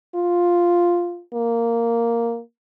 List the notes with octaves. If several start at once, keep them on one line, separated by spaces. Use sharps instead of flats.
F4
A#3